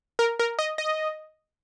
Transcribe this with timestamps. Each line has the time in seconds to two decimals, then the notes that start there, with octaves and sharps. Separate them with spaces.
0.19 A#4
0.39 A#4
0.59 D#5
0.78 D#5